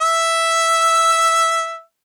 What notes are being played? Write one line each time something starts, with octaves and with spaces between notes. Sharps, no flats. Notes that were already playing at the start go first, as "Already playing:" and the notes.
E5 E6